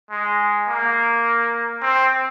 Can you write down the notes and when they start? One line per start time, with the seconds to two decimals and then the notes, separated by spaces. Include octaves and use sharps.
0.11 G#3
0.68 A#3
1.82 C4